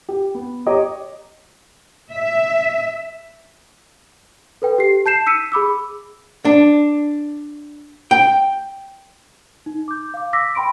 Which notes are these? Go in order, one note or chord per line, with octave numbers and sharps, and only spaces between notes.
G4
B3
G4 C#5 D#5 A#5 D6 D#6
E5
A4 B4 G5
G4 C7
A5 G6 C7 E7
E6 B6 C#7 D#7
G#4 B5 D6 E6
D4
G5
D#4
D6 G6
F5 D6
D6 E6 A#6 B6
G5 B5 C6 D7